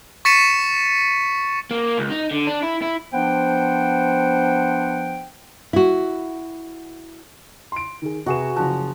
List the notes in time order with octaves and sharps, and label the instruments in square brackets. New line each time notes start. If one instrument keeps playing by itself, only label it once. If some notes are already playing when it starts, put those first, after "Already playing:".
[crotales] C#6 A6 B6 C#7 D#7 E7
[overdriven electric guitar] A#3
C#2
D#4
D3
D4
E4
E4
[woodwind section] F3 B3 D4 C5 F#5 G5
[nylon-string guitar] E4 F#4
[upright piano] C6 D7
D#3 G#4
[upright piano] C3 E7 [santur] F#4 G#4 B4
[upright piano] F#1 F#6 [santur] F3 A#5